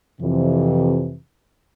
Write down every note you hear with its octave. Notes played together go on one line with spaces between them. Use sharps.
F2 C3 E3